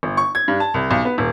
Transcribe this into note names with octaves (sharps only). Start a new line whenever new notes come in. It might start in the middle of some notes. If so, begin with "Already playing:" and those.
G1
C#6
G#6
G2
A5
C2
B1
B3
D#1